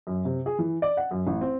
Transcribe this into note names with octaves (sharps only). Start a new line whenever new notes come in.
F#2
C3
G#4
E3
D5
F#5
F#2
A1
C4